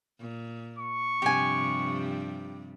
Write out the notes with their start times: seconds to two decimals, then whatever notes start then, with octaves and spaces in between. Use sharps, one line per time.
0.21 A#2
0.79 C#6
1.22 G2 C3 F3 G4 G#5